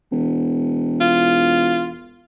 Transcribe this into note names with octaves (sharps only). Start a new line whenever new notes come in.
E1
F4